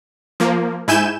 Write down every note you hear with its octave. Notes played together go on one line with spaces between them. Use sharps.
F3 A#3
G#2 E4 G#5 G6 E7